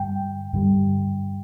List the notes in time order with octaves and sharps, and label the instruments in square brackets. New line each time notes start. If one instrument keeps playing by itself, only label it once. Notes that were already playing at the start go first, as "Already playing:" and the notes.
Already playing: [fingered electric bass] G2 D3 G3 [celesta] G5
[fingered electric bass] G2 D3 G3